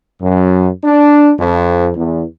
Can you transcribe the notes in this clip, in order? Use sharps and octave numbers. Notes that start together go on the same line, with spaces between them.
F#2
D4
F2
E2